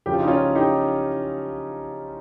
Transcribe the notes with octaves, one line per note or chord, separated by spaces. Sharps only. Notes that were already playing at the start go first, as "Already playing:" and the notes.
C#3 F3 G4
F4
D#4
C#4 F4
D#4 G4